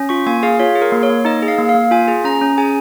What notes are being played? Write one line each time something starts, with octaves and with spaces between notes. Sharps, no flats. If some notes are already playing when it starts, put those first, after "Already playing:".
Already playing: C#4
F4 C#6
A#3 G#5
G#4 F5
F4 C#5
G#4
A#4
A#3
C#5
A#3
D#4 D#5
G#4
F5
A#3
F5
A#3
F4 G#5
G#4
C#4 A#5
C#4
G#4 G#5